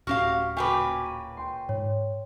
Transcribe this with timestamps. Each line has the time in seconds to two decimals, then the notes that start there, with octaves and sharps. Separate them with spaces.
0.07 D1 C#4 F#4 G4 F5 F6
0.57 A#2 C#3 F#4 B4 G5 G#5 C#6 D6
1.06 D#7
1.37 G5 C6
1.69 G#2 C#5